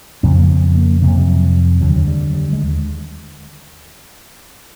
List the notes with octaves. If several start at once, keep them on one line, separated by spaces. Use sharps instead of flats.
F2 C#3 C4
A#3
B3
A#3
F2 C3 A#3
G3
F#3
D#2 D3 F#3
G3
G3
G#3